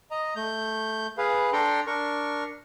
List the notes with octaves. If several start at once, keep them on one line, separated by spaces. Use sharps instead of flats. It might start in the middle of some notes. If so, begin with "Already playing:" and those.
D#5 A#5
A3 G6
G#4 B4 F5
D4 A4 G5 A#5 C6
D4 A#4 C#6